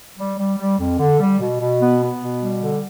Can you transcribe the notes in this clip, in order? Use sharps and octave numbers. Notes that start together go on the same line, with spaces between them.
G3
G3
G3
F2
D3
G3
B2
B2
B3
B3
B2
G3
D3